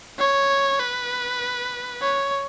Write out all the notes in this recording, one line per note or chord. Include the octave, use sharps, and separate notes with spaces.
C#5
B4
C#5